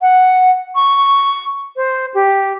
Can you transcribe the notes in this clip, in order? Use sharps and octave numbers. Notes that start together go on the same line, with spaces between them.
F#5
C#6
C5
G4